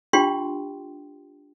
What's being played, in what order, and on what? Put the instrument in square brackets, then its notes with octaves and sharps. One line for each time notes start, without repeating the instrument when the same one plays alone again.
[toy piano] D4 F4 G4 G5 C6